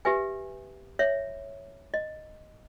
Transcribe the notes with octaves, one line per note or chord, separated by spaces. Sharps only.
G4 B4 E5 G#5
C#5 E5
D#5